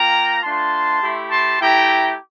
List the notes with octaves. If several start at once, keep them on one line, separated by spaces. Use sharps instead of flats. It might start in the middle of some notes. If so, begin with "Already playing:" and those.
Already playing: A#3 F4 G5 A#5
A3 D4 F4 A5 C6
A3 E4 G4
A5 C6
A3 E4 G4 G5 A#5